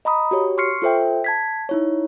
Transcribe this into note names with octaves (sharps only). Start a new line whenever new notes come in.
D#5 A#5 B5 D#6
F#4 G4 C#5
C6 C#6 F6 C7 C#7
F4 A4 C5 E5 G5
A5 G#6 B6
D#4 E4 C#5